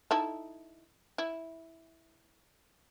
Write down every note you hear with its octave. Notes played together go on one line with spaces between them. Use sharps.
D#4 E4 A4
E4